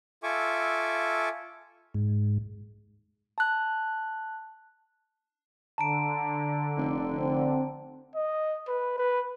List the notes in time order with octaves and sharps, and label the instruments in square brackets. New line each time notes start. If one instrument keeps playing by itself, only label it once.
[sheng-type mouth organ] F4 A4 E5 G#5 C#6 D6
[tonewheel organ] G#2
[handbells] A5 F#6
[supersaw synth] D3 [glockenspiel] A5 A#5 D7
[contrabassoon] F1
[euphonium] C4
[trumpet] D#5
B4
B4